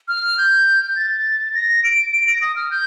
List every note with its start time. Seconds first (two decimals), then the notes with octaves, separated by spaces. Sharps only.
0.08 F6
0.38 G6
0.96 A6
1.54 A#6
1.84 D7
2.12 D7
2.27 A#6
2.41 D#6
2.56 F6
2.71 G6